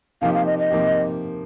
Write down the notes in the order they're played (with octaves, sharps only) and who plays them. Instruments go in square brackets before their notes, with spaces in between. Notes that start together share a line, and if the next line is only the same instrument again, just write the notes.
[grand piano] C3 F3 A#3 D#4 G4 [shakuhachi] F5
[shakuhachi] F5
D#5
D#5
[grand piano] C3 F3 A#3 D#4 G4